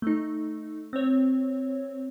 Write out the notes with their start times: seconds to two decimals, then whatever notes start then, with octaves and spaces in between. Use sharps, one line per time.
0.02 A3 D#4
0.93 C4 C#5